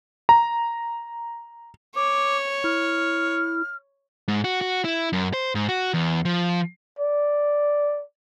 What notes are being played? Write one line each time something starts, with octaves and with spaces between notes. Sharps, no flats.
A#5
C#5 D6
E4 F6
G#2
F#4
F#4
E4
F#2
C5
G#2
F#4
E2
F3
D5